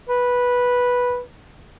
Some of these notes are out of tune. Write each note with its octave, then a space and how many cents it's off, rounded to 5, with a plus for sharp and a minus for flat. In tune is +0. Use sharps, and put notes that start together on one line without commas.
B4 -10